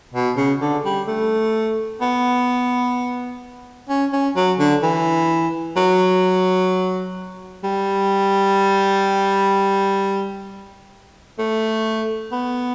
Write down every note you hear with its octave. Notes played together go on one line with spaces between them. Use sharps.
B2
C#3
D3
G3
A3
B3
C#4
C#4
F#3
D3
E3
F#3
G3
A3
B3